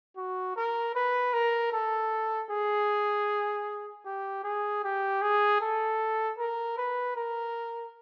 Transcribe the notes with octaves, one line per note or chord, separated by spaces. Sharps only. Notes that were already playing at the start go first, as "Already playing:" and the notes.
F#4
A#4
B4
A#4
A4
G#4
G4
G#4
G4
G#4
A4
A#4
B4
A#4